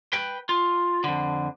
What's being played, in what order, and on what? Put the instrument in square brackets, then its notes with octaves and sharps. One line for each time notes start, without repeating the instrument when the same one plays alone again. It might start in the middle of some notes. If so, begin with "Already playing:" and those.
[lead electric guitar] B4 G5
F4
F2 D3